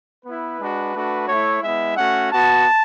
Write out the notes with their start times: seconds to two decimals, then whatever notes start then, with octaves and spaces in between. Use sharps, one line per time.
0.25 B3 E4 B4
0.59 G#3 D4 F#4
0.94 A3 D4 F#4
1.28 A3 E4 C#5
1.63 G#3 B3 E4 E5
1.97 A3 C#4 F#4 F#5
2.31 B3 F#4 A5